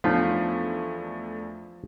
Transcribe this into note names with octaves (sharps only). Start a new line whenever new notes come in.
E2 F3 A3 D4 D#4 F4 C#5 B6